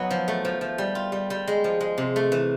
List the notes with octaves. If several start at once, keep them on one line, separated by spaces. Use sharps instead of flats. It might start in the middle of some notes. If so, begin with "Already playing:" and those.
Already playing: F#3 B3 D#4
F3
A3
F3
F3
G3
F4
G3
G3
G#3
F3
G#3
C3
A3
E3